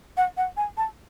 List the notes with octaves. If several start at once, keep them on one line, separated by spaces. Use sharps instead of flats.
F#5
F#5
G#5
A5